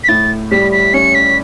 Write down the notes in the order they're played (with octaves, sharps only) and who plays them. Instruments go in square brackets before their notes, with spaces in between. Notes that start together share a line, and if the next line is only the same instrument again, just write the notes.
[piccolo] B6
[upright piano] A2 [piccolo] A6
[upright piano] G3 [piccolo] B6
[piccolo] B6
[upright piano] C#4 [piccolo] C#7
[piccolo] B6